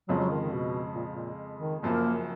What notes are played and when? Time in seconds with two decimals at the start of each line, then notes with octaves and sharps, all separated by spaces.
0.08 F2 C#3 F3 F#3 G#3
0.19 F#3
0.31 D#3
0.41 D#3
0.52 B2
0.95 A#2
1.12 A#2
1.60 D#3
1.82 F#1 F#2 F3 A#3